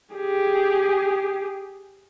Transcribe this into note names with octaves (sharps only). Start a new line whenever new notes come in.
G4 G#4